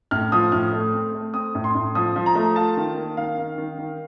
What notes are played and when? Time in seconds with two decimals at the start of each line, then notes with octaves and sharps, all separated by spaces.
0.11 A2 F6
0.32 F3 D#6
0.52 A2 F6
0.73 A3
0.94 C4
1.14 A3
1.34 C4 D#6
1.55 A2
1.64 C6
1.75 A2
1.95 F3 D#6
2.16 F3
2.26 A#5
2.35 A3
2.56 F4 A5
2.77 D#3
2.97 A#3
3.17 D#3 F5
3.38 D#3
3.58 D#3
3.79 D#3